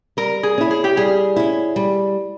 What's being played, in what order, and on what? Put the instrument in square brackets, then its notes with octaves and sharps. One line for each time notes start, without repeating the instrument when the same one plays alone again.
[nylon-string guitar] G3 [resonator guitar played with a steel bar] A#4
[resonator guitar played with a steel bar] G#4
[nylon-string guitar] C#4 E4
[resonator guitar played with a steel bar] G#4
G4
[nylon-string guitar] G3 [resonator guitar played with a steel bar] G#4
[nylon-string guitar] C#4 E4
G3